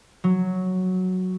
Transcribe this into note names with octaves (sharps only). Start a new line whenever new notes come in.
F#3